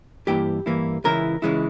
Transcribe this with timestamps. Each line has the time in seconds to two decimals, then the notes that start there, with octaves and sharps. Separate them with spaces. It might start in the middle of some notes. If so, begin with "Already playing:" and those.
0.27 G2 E3 A#3 E4 G4 G5
0.66 G2 E3 A#3 E4
1.04 C#2 C#3 E3 E4 A#4
1.42 C#2 C#3 E3 G#3 E4